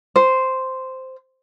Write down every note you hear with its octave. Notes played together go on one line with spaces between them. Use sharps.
C5